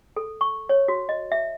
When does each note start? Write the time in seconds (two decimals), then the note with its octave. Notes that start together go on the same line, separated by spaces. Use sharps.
0.16 A4
0.41 C#6
0.69 C#5
0.88 F#4
1.09 D#5
1.32 E5